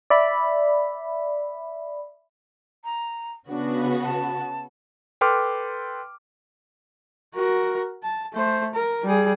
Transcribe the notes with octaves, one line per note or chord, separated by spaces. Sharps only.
D5 E5 B5
A#5
C#3 B3 D4 F#4
A5
A4 B4 G5 C6 D6 F6
F#4 A#4
A5
A3 C5
A#4
G3 G#4